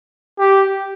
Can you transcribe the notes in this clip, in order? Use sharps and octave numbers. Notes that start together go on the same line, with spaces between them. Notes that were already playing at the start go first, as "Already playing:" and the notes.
G4